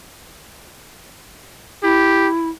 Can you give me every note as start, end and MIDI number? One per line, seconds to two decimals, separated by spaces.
1.83 2.49 64
1.83 2.28 67